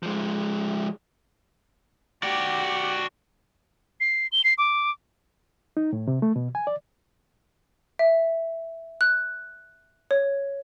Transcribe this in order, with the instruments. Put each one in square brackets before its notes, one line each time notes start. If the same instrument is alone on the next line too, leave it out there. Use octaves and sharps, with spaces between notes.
[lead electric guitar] F3 G#3
[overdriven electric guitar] F#4 D5 [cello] G4
[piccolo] C7
G7
C7
D6
[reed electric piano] D#4
A2
C3
A3
B2
G#5
D5
[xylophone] E5
F#6
C#5